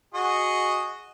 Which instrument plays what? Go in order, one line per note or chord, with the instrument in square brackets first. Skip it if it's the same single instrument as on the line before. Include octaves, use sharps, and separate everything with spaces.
[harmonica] F#4 G#4 D#5